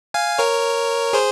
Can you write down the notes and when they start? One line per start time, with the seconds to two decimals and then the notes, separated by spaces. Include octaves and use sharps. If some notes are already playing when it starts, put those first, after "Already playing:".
0.14 F5 G#5
0.38 A#4 C#5
1.13 G#4 C5